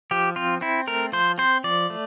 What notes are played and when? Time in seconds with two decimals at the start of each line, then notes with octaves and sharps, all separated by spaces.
0.11 F3 G4
0.36 C4 F4
0.61 C4 E4
0.87 A3 A#4
1.12 F3 C5
1.38 C4 C5
1.64 F3 D5
1.90 A3